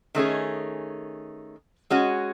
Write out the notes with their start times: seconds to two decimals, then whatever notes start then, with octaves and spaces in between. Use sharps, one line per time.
0.15 D#3 A3 C#4 G#4
1.90 G#3 C#4 F#4